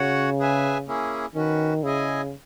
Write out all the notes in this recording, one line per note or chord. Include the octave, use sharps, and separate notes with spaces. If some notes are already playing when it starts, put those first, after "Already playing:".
Already playing: C#3 F#4 C#5 F#5
G#4 B4 E5 G#5
A#3 C#4 E4 G#4
D#3 C#4 F#4 B4
C#3 E4 G#4 D#5 G#5